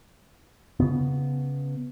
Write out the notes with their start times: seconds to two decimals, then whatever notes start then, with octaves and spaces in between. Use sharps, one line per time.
0.80 C#3 B3